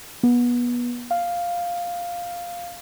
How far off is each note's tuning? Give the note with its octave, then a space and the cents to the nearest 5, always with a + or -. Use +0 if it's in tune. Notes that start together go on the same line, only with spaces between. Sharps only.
B3 -25
F5 +0